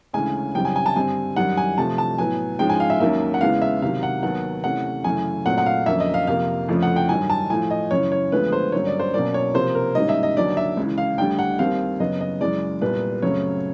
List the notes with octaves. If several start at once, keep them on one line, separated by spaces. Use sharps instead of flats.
D2 C#3 E3 G#3 C#4 G#5
F#2 C#3 E3 G3 C4 G5
G#5
G#5
A5
G2 D3 G3 C4 G#5
F#2 D#3 G3 F#5
G#5
C3 F3 A3 A5
A5
A2 F#3 B3 G#5
G#2 F3 G#3 C#4 G5
G#5
F5
E5
D#2 D#3 F#3 A#3 C#4 E5
F#5
E2 C#3 E3 G#3 B3 F5
E5
C3 D#3 F#3 F5
F#5
D#2 D#3 F#3 B3 F#5
C3 E3 A3 C#4 F#5
F#2 C#3 E3 A3 G#5
A#2 F#3 A3 C4 F#5
F#5
F5
F2 D3 F#3 A#3 C#4 E5
D#5
F5
F2 C3 F3 A#3 F5
F2 C#3 F3 A3
F#5
G5
G2 D#3 F#3 G#5
A5
A2 F3 A3 G#5
D#5
F#2 C#3 E3 C#5
C#5
D2 D3 F3 G#3 B3 B4
C5
G2 D3 F#3 A#3 C#4 C#5
D5
C5
B2 F#3 A#3 C#4 D5
C#5
C3 F3 A#3 C5
A#4
G#2 D#3 G3 A#3 C#4 D#5
E5
D#5
D#2 D3 F#3 D5
E5
C#2 C#3 E3
F5
D2 D3 G3 G5
F#5
D#2 D#3 G3 C4 F5
F#2 C#3 F#3 B3 D#5
D#5
F#2 C#3 E3 G#3 D5
C2 A#2 G3 B3 B4
F#2 C#3 F#3 A3 C4 C#5